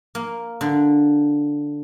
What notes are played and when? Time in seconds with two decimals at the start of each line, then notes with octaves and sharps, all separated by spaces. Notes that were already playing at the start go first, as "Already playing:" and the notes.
0.15 A#3
0.61 D3